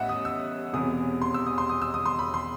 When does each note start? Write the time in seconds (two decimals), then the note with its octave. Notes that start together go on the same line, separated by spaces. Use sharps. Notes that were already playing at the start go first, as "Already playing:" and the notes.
Already playing: A1 A2 G3 B3 D#5 E5 F#5
0.09 D#6
0.25 E6
0.73 E1 E2 C3 E3 D#6
1.22 C6
1.34 E6
1.46 D#6
1.58 C6
1.69 D#6
1.82 E6
1.94 D#6
2.06 C6
2.19 B5
2.34 C6